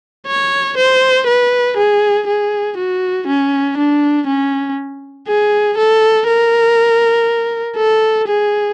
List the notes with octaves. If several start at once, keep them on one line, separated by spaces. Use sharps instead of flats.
C#5
C5
B4
G#4
G#4
F#4
C#4
D4
C#4
G#4
A4
A#4
A4
G#4